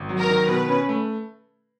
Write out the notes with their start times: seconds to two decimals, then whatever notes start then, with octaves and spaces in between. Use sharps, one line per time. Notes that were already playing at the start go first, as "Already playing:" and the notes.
Already playing: G#1
0.09 F#3
0.19 A#4
0.29 D#3
0.49 B2 B4
0.69 C#4
0.89 A3